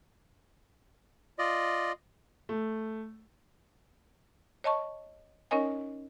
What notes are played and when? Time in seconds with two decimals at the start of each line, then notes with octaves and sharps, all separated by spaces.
1.39 F4 D5 D#5
2.49 A3
4.64 C#5 D#5 A5 C#6
5.51 C#4 D#4 A#4 C#5 D#5 G#5